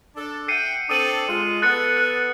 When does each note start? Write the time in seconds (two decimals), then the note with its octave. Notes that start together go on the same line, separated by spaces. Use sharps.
0.16 D4 A4
0.48 E5 F#5 G5 C7 C#7 D#7
0.89 C4 D4 A4 D#6 D#7 F#7
1.29 G#3 F4
1.62 B3 A4 F#6 A6 C#7
1.97 F#6